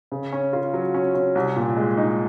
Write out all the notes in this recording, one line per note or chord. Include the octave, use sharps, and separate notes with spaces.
C#3
C#4
F4
F#3
C#4
C#4
C2
A#2
G#3
D#4